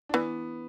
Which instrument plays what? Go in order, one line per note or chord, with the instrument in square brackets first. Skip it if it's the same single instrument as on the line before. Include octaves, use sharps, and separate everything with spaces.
[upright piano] D4
[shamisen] E3 [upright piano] B3